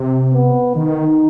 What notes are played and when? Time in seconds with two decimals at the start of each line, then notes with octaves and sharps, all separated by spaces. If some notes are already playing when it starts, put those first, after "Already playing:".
Already playing: C3
0.34 B3
0.76 D#3 D#4